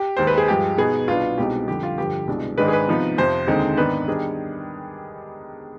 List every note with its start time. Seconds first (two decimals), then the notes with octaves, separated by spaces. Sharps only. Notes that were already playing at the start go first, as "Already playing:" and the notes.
Already playing: G4
0.17 D#2 D#3 G#3 C5
0.27 B4
0.38 G#4
0.48 G2 F3 G#3 G4
0.78 B2 B3 D#4 G#4
1.08 C2 B2 B3 D4 F4
1.38 C2 B2 G#3 C4 D#4 G4
1.68 F2 D3 G3 G4
1.83 F4
1.98 G2 D3 F3 G4
2.27 C2 B2 G#3 D4
2.58 G#2 D#3 G#3 D4 B4
2.68 G#4
2.73 B4
2.87 C3 F3 B3 D#4
3.18 F2 C3 F3 C5
3.47 D#2 D3 G#3 C4 D#4
3.77 G#2 D#3 B3 D4 B4
4.08 D#3 G3 B3 D4 G#4